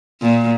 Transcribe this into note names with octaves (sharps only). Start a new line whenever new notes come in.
A#2